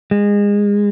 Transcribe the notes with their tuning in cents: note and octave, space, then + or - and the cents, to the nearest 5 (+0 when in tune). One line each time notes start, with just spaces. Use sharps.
G#3 -25